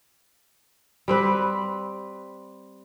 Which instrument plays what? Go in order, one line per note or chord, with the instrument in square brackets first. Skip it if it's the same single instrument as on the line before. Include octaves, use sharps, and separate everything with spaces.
[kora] G3 C4 B4